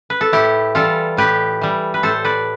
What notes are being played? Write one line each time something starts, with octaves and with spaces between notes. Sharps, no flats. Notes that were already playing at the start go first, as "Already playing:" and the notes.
B4
A4
A2 E4 G4
E3 G3 F4 A4
A2 G4 B4
E3 G3
B4
A2 A4 C5
B4 D5